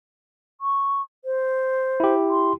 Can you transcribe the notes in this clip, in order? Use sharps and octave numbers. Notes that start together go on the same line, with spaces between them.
C#6
C5
E4 G4
C6